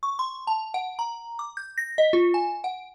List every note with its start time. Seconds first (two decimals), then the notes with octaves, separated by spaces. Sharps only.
0.03 C#6
0.19 C6
0.47 A5
0.74 F#5
0.99 A#5
1.39 D6
1.57 G6
1.78 A#6
1.98 D#5
2.13 F4
2.34 G#5
2.64 F#5